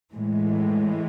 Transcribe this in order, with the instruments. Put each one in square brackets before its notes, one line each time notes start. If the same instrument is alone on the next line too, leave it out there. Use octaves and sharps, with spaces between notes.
[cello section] A2 E3 G#3